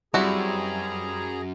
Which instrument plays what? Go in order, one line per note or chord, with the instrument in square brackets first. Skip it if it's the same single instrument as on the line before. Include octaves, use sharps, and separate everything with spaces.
[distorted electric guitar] F#2 [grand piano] G3 [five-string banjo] C4 E4 F#4 [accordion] G#4 A#5